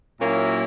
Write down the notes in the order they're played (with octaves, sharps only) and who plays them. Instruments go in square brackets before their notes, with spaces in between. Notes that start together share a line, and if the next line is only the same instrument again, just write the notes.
[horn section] A#2 F#3 A#3 C#4 E4